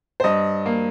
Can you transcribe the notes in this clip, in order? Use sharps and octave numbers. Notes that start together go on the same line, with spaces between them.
C5
G2 D#5
A#3